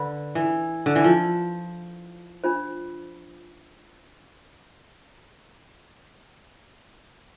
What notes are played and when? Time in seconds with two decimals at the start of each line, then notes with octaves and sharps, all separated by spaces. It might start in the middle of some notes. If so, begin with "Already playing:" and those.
Already playing: D3 B4 B5
0.35 E3
0.86 D3
0.96 E3
1.04 F3
2.44 D4 F4 C5